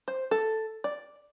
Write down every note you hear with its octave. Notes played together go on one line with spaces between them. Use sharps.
C5
A4
D5